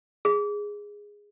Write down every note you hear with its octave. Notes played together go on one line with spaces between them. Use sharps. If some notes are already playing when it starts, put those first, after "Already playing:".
G#4